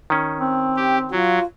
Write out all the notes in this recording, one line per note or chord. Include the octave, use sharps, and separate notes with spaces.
D#3 C#4
C4
G4
F#3 F4